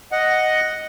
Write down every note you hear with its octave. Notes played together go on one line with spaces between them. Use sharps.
D#5 F#5